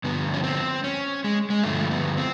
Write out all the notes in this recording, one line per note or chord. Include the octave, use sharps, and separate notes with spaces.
G2 D3 F3 B3
C#4
C4
C#4
G#3
G#3
G2 D3 F3 A3
B3
C4